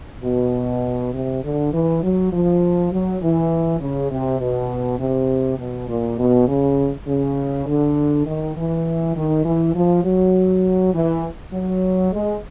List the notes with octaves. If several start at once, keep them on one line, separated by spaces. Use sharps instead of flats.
B2
C3
D3
E3
F#3
F3
F#3
E3
C#3
C3
B2
C3
B2
A#2
B2
C#3
C#3
D3
D#3
E3
D#3
E3
F3
F#3
E3
F#3
G#3